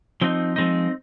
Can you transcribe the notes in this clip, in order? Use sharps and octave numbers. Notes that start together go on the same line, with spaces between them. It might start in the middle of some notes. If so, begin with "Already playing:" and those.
F3 C4 D#4
F3 G#3 C4 D#4